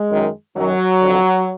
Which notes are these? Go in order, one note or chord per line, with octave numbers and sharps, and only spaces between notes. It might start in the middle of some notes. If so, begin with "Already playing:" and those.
Already playing: G#3
F#2 D#3
F#2 D#3 F#3
F2 D3